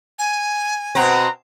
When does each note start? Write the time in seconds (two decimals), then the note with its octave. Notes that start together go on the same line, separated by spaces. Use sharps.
0.19 G#5
0.95 B2 C4 F#5 A#5